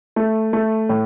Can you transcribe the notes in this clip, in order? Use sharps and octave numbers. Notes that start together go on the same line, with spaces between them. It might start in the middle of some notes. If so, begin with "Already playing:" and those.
A3
A3
A2